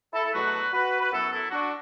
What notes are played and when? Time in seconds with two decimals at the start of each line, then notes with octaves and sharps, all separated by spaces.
0.13 E4 A4
0.24 A4
0.33 E2 B2 F#3 A3 F#4 B4
0.73 F#4 B4
1.00 B4
1.12 F#2 F#3 B3 E4 A4
1.32 E4 A4
1.51 D4 F#4